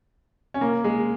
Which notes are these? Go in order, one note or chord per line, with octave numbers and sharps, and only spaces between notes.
C#4
A#3
G#3